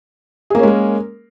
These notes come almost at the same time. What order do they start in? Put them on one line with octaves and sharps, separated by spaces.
G#4 A#3 C#4 G#3 A#4